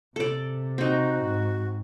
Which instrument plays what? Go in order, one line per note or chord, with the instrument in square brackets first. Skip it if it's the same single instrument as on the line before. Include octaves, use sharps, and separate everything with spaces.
[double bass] C3 [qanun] A4 D5
[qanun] C4 D#4 [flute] F#4
[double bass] G#2